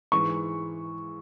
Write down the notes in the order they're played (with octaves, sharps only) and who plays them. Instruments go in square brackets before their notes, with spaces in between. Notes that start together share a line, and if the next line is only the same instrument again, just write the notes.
[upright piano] G#2 E3 G#3 [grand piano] C#6